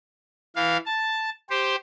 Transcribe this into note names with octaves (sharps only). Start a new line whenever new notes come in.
E3 F5
A5
G4 C5